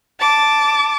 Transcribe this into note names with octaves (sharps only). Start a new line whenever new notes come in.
A5 D6